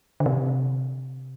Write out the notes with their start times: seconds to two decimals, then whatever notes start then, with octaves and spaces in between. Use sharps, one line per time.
0.20 D3
0.26 C3